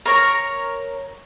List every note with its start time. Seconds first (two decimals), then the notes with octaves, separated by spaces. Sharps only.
0.06 A#4 C#5 A#5